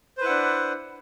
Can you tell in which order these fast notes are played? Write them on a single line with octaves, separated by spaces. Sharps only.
C5 B4 E4 F#5 D4